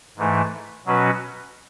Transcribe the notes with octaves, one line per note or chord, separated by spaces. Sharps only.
G#2 E3 A3
B2 F#3 C#4 F#4 B4